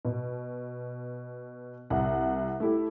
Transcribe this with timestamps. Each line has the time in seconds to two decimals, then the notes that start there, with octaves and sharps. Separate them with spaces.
0.05 B2
1.90 C2 F#5
2.60 A3 E4 G4